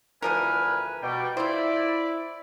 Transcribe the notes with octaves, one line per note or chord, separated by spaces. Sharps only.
D2 E3 F3 A#4 B4 G#5 F6
B2 G3 G5
E4 F4 C5 D5